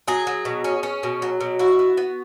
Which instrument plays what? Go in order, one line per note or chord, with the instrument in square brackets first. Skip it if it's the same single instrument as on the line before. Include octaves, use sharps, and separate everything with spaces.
[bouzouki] F#3 G#4
F#3
B2
C#4
C#4
B2
F#3
B2
E4 F#4
B3
B3